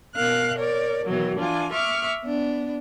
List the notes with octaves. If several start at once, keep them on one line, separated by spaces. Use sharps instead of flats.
B2 A#4 F5 F#6
A#4 C#5 D5
B2 D#3 E3 F#3
E3 D4 F4 G#5
E5 C#6 D6 F6
B3 D4